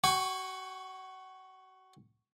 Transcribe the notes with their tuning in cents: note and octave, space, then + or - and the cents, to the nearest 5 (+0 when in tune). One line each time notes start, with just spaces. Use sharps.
F#4 +30 G#5 -40 C#6 +0